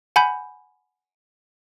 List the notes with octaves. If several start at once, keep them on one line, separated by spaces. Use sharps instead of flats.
F#5 G#5 B5 G6